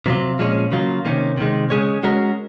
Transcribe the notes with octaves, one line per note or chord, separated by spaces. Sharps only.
C3 F#3 C4 F4
A#2 F3 G#3 C#4
C#3 F#3 A#3 F4
C3 D#3 A#3 C#4
C3 D#3 G#3
C#3 G#3 C#4 G#4 C#5
G#3 C#4 F#4 A#4